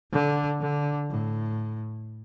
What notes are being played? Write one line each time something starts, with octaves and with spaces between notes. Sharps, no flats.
D3
D3
A2